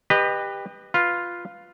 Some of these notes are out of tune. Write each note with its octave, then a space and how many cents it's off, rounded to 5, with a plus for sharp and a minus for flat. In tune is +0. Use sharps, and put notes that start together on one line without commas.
G4 +20 B4 +0 D#5 -20
F4 +0 B4 +0